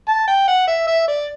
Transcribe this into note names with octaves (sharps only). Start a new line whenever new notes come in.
A5
G5
F#5
E5
E5
D5